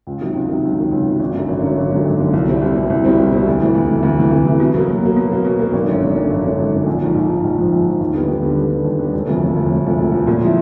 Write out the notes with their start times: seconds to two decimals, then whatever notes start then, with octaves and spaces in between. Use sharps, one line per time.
0.07 C#2
0.21 C3 D#3 F#3
0.35 C#2
0.49 C3 D#3 F#3
0.64 C#2
0.78 C3 D#3 F#3
0.92 C#2
1.06 C3 D#3 F#3
1.20 G#1
1.34 F#2 D3 F#3
1.48 G#1
1.62 F#2 D3 F#3
1.77 G#1
1.91 F#2 D3 F#3
2.05 G#1
2.19 F#2 D3 F#3
2.33 C2
2.47 B2 G3 C4 E4
2.62 C2
2.76 B2 G3 C4 E4
2.90 C2
3.04 B2 G3 C4 E4
3.18 C2
3.32 B2 G3 C4 E4
3.47 D2
3.60 C3 E3
3.75 D2
3.89 C3 E3
4.03 D2
4.18 C3 E3
4.31 D2
4.46 C3 E3
4.60 B2
4.74 F#3 A#3
4.89 B2
5.03 F#3 A#3
5.16 B2
5.31 F#3 A#3
5.45 B2
5.59 F#3 A#3
5.73 G#1
5.88 F#2 D3
6.02 G#1
6.16 F#2 D3
6.30 G#1
6.45 F#2 D3
6.58 G#1
6.73 F#2 D3
6.86 A#1
7.01 G#2 F3
7.15 A#1
7.29 G#2 F3
7.44 A#1
7.58 G#2 F3
7.72 A#1
7.86 G#2 F3
8.01 D#2
8.14 D3 G3 B3
8.28 D#2
8.43 D3 G3 B3
8.57 D#2
8.71 D3 G3 B3
8.85 D#2
8.99 D3 G3 B3
9.14 E1
9.28 D2 C3 F3
9.42 E1
9.56 D2 C3 F3
9.70 E1
9.84 D2 C3 F3
9.98 E1
10.12 D2 C3 F3
10.27 A#2
10.41 F3 G#3 C4 E4